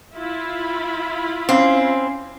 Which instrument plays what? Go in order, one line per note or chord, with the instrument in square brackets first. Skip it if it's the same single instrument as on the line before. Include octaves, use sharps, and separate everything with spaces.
[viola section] E4 F4 B5
[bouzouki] C4 [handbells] C#4 F5